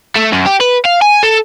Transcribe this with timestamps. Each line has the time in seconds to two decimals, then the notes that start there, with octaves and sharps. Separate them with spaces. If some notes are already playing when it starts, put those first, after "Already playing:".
0.16 A3
0.32 F#2
0.46 G4
0.60 B4
0.85 F5
1.02 G#5
1.23 A4